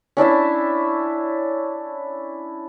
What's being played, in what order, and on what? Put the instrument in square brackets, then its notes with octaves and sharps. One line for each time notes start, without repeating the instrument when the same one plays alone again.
[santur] C#4 D4 E4 E5